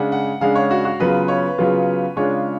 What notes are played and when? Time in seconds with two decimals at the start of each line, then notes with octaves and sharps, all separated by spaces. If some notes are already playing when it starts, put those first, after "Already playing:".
Already playing: C#3 G#3 D4 F#5
0.12 F#5
0.41 C#3 G#3 D4 F5
0.55 C#5
0.71 F#4
0.85 F#4
1.00 C#3 F#3 B3 F4 B4
1.28 C#5
1.58 C#3 F#3 B3 F4
2.16 C#3 G#3 D4 F4 C#5